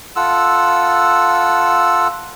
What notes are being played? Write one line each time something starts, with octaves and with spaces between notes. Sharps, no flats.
F4 A4 F#5 E6